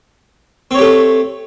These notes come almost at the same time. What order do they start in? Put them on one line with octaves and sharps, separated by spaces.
C4 C#5 G4 A3